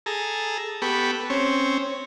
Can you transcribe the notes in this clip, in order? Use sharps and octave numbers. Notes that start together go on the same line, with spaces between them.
G#4 A4 A#5
B3 G4 A4 B5 C#6
C4 C#4 C#5